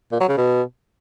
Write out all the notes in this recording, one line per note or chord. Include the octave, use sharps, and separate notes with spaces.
A#2
F#3
C#3
B2